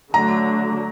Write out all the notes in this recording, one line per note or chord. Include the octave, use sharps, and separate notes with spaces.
D3 F#3 A3 D4 A#5